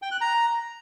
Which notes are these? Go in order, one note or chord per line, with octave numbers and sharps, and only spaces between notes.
G5
F#6
A#5